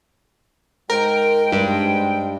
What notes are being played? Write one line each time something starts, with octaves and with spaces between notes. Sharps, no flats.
G#2 G#3 A#4 G5
G2